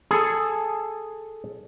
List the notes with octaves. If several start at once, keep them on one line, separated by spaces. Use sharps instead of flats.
G#4 A4